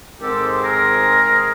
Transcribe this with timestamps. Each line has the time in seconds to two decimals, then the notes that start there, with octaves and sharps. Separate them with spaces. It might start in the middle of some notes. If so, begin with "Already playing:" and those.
0.21 G#2 D#3 G#3 C4 G4 A4
0.62 G#4 A#4